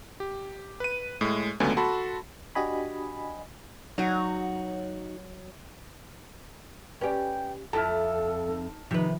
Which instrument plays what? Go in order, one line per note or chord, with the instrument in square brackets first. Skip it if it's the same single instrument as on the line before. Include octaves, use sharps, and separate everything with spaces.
[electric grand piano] G4
B4 D#7
A2 G#3
C#2 D3 F#3 A3 B3 G#5
F#4 A4 A5 B5 C6
[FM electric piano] D4 F#4 G4 D#5 G#5 B5
[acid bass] F#3 [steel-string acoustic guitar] D#4 F#4
[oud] C#4 G4 [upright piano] B4 D5 [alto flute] G5
[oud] F2 E4 [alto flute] A4 [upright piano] A5 F6
[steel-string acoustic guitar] D#4
[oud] C3 B4 [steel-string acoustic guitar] D#3 F3 [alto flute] D#4